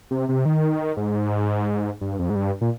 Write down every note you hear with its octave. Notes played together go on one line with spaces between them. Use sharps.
C3
C3
D#3
G#2
G2
F2
G#2
G2
A#2